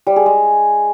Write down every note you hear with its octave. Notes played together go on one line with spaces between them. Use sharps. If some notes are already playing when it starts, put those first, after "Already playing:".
G3
G#4
G#3